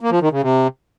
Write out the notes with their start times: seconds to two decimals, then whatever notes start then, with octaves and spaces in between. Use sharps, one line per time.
0.01 A#3
0.11 F3
0.21 D#3
0.32 C#3
0.42 C3